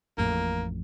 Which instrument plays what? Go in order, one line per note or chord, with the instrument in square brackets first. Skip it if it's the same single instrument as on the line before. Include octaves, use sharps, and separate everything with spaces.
[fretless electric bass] A1 F2 A2 [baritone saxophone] A#3